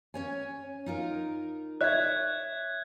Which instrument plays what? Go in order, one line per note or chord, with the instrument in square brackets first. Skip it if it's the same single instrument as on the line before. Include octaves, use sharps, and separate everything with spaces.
[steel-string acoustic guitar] C#4 C#5 G#5
D#4 F4 A#4
[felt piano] C#5 E5 [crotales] F#6 G#6